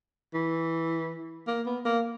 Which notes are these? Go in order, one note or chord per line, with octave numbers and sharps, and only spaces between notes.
E3
A#3
B3
A#3